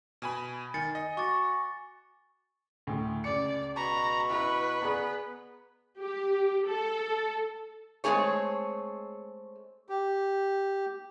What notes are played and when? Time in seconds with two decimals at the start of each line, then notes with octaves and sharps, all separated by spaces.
0.22 B2 G#5 B5
0.74 D#3 G#5 A6 C#7
0.95 D#5
1.17 F#4 C#6 D6 A6
2.87 D2 A2
3.24 C#2 D5 C#7
3.76 B2 A#5 B5 C#6
4.30 E4 B4
4.81 B3 G#4 D5 A#5
5.99 G4
6.69 A4
8.04 G#3 A3 C4 G#4 C#5
9.89 G4